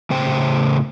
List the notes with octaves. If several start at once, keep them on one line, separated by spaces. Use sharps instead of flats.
A2 C#3 C5 G5